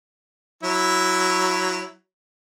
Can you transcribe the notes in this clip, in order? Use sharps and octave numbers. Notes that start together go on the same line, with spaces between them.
F#3 E4